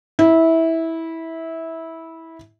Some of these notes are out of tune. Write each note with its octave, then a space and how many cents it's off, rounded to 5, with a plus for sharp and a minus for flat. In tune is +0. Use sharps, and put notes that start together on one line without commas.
E4 -15 E5 -20